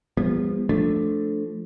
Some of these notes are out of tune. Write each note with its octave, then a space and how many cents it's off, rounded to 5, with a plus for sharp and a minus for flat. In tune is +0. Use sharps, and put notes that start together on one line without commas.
F3 +0 G#3 -45 B3 -10
F3 +0 A3 +0 D4 +0